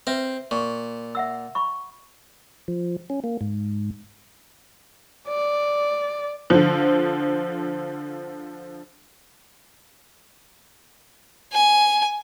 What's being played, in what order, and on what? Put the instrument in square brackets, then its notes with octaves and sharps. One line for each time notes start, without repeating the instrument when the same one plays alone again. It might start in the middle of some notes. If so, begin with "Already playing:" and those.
[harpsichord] C4 [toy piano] B4 E5
[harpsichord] A#2 [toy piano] C#6
[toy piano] E5 F#5 E6
B5 C#6
[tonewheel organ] F3
C#4
A#3
G#2
[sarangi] D5
[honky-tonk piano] D3 F3
[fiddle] G#5